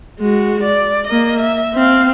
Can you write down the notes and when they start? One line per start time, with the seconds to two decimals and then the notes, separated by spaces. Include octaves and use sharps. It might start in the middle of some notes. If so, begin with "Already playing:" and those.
0.19 G#3 F#4
0.63 D5
1.07 A#3 D#5
1.39 E5
1.74 C4 F5